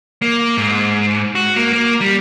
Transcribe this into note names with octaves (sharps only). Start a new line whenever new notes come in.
A#3
G#2
F#4
A#3
A#3
G3